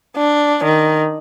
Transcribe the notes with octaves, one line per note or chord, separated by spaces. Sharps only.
D4
D#3